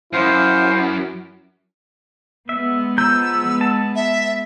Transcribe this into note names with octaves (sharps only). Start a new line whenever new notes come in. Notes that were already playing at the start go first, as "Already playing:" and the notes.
F#2 E4 C5 F5
G#3 B3 E5
F3 A#5 E6 G6
A5
E5